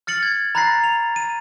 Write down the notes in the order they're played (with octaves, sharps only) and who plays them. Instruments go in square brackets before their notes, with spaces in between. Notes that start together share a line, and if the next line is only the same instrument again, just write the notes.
[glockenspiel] F6 A6 C#7 F#7
G#6
A#5 B5 F#6 A6 A#6 C7
F7
D#7